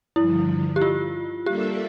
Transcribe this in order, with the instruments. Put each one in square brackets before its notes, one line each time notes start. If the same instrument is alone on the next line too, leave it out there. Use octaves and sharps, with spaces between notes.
[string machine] G2 D3 F3 [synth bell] E4
[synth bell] G4
F4
[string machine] G3 A#3 D4 A4 E5 [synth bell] G4